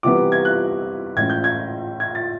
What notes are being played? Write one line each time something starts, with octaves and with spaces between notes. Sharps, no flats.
C3 E3 G3 B3 D6
G#6
F#6
A2 E3 G#3 C#4 G#6
G6
G#6
G#6
A6